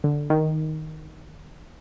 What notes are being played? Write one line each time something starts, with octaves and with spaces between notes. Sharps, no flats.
D3
D#3